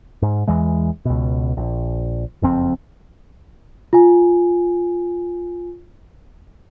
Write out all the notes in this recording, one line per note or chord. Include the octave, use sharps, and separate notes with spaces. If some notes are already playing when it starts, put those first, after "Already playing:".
G#2
E2 E3 G#3
C#2 B2
A#1
F#1 F2 C4
F4 G#5